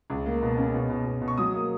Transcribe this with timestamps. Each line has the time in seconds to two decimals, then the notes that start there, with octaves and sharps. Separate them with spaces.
0.10 C#2
0.26 A#3
0.42 B2
0.57 C#4
0.75 B2
0.90 B2
1.06 B2
1.22 B2
1.28 C#6
1.38 F#3 D#6
1.54 A#3